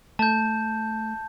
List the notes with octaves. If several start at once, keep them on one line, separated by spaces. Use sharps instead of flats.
A3 A5 G6